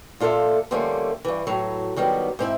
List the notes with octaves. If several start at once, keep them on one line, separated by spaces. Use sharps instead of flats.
A#2 F4 A4 D5 E5
D3 F3 G3 A3 A#3 C#4
G2 E3
A2 F#3
D#3 F#3 G3 B3
G#2 C4 E4